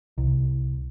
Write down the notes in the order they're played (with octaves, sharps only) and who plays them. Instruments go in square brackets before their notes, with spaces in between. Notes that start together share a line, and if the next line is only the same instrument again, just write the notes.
[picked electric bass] C2